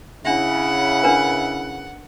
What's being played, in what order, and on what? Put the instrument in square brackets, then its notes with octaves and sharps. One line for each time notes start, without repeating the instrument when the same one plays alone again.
[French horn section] C#3 E4 [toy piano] D4 E5 [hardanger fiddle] F#5
[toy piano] D4 A#4 B4